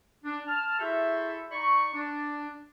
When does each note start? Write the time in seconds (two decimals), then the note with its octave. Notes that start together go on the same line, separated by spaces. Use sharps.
0.24 D4
0.47 A5 F6
0.80 E4 F#4 G#4 A4 C5 E5
1.50 D#4 D5 B5 C#6
1.94 D4